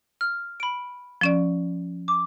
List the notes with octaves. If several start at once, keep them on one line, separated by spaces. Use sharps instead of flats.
F6
B5 D7
F3 C#4 D5
D6